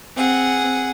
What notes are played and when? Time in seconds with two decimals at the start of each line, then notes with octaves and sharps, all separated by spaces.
0.16 C4 G#4 F#5